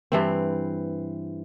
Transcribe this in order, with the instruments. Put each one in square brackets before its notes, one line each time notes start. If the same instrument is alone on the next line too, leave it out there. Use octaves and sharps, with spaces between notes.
[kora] G2 E3 C4